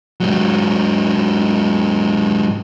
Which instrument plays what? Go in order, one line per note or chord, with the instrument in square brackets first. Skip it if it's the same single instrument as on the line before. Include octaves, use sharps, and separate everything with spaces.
[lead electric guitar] G#2 F#3